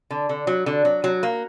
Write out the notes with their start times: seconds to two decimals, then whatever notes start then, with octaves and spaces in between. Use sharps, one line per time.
0.11 D3
0.29 D3
0.47 F#3
0.66 D3
0.85 F#3
1.04 F#3
1.23 A#3